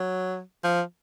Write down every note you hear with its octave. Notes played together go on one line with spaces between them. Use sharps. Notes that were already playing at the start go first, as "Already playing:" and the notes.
Already playing: F#3
F3